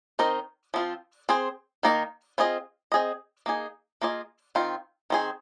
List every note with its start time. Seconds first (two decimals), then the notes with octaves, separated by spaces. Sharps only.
0.19 D#3 C4 D#4 A#4 D#5
0.74 F3 C4 F4
1.29 C4 G#4 C5
1.83 D#3 A#3 D#4 A#4
2.38 C4 F4 G#4 D#5
2.92 C4 G#4 D#5
3.46 A#3 D#4 G#4
4.01 A#3 F4 G#4 D#5
4.55 D#3 C4 F4
5.10 D#3 C4 G#4